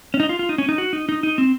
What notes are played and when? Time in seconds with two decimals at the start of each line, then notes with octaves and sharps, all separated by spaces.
0.14 C#4
0.20 D#4
0.29 F4
0.39 F4
0.49 D#4
0.58 C#4
0.69 D#4
0.78 F#4
0.93 D#4
1.09 D#4
1.23 D#4
1.38 C4